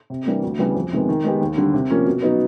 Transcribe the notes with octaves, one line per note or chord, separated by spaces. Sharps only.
C3
E3 G3 A#3 D4
D2
C#3 E3 G3 B3
F2
C3 D#3 G#3 B3
D#3
G#3 B3 D#4 G4
D#2
D3 G3
C3
F3 A#3 C#4
B2
F#3 B3 D#4